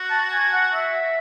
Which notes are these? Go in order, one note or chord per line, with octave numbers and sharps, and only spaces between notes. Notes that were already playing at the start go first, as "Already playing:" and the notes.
Already playing: F#4
A5
G#5
F#5
E5